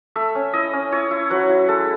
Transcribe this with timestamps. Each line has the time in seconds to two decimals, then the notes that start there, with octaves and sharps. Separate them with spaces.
0.16 A3 E5
0.35 C#4
0.53 E4 D#5
0.73 C#4
0.92 E4 C#5
1.11 E4
1.30 F#3 B4
1.49 E4
1.69 G#3 A4